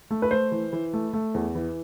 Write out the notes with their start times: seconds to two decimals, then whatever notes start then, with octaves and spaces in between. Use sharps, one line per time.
0.10 A3
0.22 B4
0.31 A3 C5
0.52 E3
0.73 E3
0.93 A3
1.13 A3
1.34 E2
1.55 E3